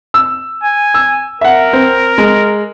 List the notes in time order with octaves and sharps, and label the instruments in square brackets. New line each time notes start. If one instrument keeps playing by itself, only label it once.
[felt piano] E6
[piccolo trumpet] G#5
[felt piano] E6
[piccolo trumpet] A#4 [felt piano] E5 F#5
[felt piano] C4
G#3